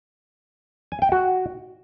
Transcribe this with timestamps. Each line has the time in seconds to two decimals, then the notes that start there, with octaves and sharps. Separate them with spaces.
0.92 G#5
1.02 G5
1.12 F#4